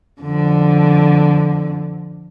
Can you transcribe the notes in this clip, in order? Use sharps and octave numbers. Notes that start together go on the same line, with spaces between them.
F2 D3